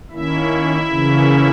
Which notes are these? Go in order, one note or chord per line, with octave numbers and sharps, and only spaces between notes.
D#3 A#3 C#4 E4 E5
C#3 E3 A#3 C#4